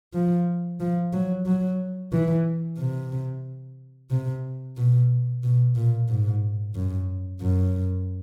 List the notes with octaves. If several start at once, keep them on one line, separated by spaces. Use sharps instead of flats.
F3
F3
F#3
F#3
E3
C3
C3
B2
B2
A#2
G#2
F#2
F#2